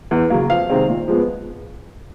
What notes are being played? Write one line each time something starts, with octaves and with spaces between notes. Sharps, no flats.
E2
C#3 F#3 A#3
F2 F5
C3 D#3 G#3 C4
A#2
F3 G#3 B3